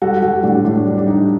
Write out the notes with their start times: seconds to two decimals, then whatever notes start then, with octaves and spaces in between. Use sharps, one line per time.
0.02 G3 F#4 A4
0.22 G3 F#4 A4
0.43 A2 D4 F#4
0.64 A2 D4
0.86 G3 D4
0.97 D4
1.07 G3 D#4